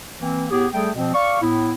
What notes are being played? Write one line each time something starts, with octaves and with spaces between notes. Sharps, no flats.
E3 A#3 C4
A2 B3 G4 G#4
G3 A3 G#4 A4 G5
B2 F3 C4
D5 F5 C#6
A2 B3 E4